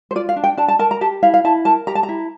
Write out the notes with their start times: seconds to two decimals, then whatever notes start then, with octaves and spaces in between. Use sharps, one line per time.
0.11 C5
0.15 F4 D5
0.29 F5
0.36 D4
0.44 G5
0.57 D4 A5
0.68 A5
0.79 A#4 A5
0.91 A#5
1.01 G4 A5
1.23 E4 F5
1.34 F5
1.44 E4 A5
1.65 A#4 A5
1.87 G4 A#5
1.95 A5
2.03 A#5
2.09 E4